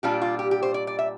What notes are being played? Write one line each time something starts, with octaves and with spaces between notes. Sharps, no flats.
A#2 G3 D4 F4 G4
F4
G4
G4
C5
D5
D5
E5